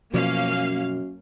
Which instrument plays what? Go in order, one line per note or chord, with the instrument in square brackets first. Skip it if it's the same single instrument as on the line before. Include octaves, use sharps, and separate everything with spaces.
[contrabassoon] F#2 [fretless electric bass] B2 F3 [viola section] A#3 C#4 F5